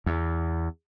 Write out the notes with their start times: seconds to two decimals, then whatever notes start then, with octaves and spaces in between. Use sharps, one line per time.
0.06 E2